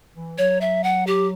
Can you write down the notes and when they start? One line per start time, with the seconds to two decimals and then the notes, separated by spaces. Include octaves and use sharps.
0.15 E3
0.38 F#3 C#5
0.61 E5
0.84 F#5
1.07 G4